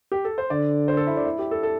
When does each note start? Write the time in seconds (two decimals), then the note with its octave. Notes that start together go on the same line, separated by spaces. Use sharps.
0.12 G4
0.25 A4
0.38 C5
0.50 D3 D5
0.88 C5
0.97 A4
1.07 E4
1.17 D4
1.25 E4
1.39 G4
1.51 A4
1.63 A4